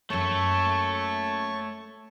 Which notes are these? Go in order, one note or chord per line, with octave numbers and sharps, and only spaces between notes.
F#2 A3 A#3 A4 C#5 A5 C#6